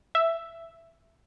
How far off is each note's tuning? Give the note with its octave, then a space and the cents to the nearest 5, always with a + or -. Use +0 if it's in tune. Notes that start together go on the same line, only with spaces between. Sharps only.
E5 +5